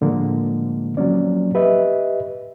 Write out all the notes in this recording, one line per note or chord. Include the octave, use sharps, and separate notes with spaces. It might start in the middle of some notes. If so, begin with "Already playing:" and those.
A2 D3 F3 G#3 A#3
F3 F#3 A#3 C4 C#4 D5
G4 B4 D#5 E5